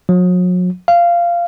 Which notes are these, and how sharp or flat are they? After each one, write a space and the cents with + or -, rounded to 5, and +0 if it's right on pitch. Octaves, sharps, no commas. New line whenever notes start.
F#3 -40
F5 -15